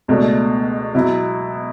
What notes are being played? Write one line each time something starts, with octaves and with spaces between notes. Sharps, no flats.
C#2 B2 A3 D4
B2 F#3 B3 E4